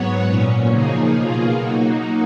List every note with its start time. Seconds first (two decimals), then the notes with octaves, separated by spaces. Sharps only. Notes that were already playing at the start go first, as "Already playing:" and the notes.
Already playing: G#2 F#3 B3 F#4 C#5
0.26 A#2 F#3 C#4
0.69 C#3 F3 A#3 D#4 G#4
1.12 B2 A#3 F4 G#4
1.55 F#3 A#3 D#4 F#4